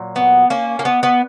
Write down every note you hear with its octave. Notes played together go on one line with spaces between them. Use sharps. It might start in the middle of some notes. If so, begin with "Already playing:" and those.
Already playing: A#2 F#3
B3
A#3 C#4
A#3
B3
B3